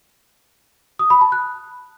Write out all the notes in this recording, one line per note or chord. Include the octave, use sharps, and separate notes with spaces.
D#6
B5
A5
F#6